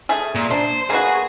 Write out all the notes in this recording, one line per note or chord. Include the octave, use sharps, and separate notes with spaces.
A3 G#4
A#2
D4 C5
A#3 B3 F#4 G#4